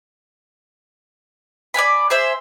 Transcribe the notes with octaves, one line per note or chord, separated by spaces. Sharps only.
D5 F5 G#5 B5
G#4 C5 E5